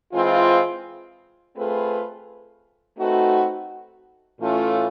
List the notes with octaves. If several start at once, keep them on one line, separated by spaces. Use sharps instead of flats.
E3 G#3 C4 F4
A3 C4 F4 G#4 B4
A3 C4 D#4 F#4 B4
A2 E3 A3 C#4 F4